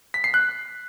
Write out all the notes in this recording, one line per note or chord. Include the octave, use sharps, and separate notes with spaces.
B6
C7
F#6